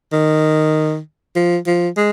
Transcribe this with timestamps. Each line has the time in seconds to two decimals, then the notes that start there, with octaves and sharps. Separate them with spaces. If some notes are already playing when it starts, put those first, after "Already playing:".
0.12 D#3
1.36 F3
1.67 F3
1.97 G#3